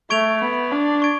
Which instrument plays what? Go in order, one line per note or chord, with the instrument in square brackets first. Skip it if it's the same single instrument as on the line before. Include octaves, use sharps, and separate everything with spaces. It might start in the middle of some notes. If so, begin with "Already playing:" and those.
[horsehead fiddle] A3 [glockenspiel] C#6 G#6 D7 F7
[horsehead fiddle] B3
D4
[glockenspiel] C#6 G#6 D7